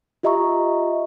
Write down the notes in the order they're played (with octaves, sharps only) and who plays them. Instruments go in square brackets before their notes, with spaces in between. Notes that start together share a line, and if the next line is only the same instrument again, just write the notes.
[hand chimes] F4 G4 D#5 E5 A#5 C#6